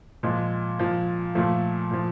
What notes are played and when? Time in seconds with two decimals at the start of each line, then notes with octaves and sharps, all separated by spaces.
0.23 A#2 F3 G#3
0.79 A#2 F3
1.35 A#2 F3 A3
1.91 A#2 F3